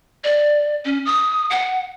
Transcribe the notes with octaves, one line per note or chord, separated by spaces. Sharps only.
D5
C#4
D#6
F#5